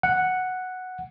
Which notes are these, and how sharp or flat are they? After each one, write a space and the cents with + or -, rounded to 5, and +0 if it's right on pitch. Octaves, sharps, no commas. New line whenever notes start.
F#5 +0